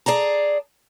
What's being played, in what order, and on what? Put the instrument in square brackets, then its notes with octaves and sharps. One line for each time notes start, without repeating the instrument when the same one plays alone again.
[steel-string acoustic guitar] G#4 D5 A5 A#5